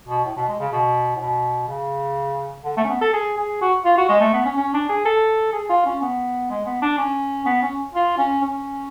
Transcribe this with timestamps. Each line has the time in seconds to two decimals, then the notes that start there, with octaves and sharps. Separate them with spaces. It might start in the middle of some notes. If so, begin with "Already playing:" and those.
0.09 B2
0.25 A2
0.37 B2
0.48 G#3
0.60 C#3
0.72 B2
1.16 A2
1.21 B2
1.68 C#3
2.64 D3
2.77 A3
2.84 C#4
2.89 B3
3.01 A4
3.13 G#4
3.37 G#4
3.62 F#4
3.85 F4
3.97 F#4
4.09 G#3
4.21 A3
4.33 B3
4.45 C#4
4.57 C#4
4.74 D4
4.89 G#4
5.06 A4
5.53 G#4
5.69 F4
5.86 C#4
6.02 B3
6.50 G#3
6.66 B3
6.82 D4
6.98 C#4
7.46 B3
7.62 C#4
7.95 F4
8.18 C#4
8.42 C#4